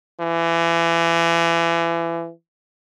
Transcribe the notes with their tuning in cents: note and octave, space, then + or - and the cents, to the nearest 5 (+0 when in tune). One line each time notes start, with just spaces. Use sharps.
E3 +30